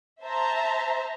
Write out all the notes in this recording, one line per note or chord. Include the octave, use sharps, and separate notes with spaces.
C5 E5 A5 A#5